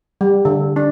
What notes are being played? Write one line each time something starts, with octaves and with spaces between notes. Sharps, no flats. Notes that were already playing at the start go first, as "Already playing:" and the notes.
G3
D3
D4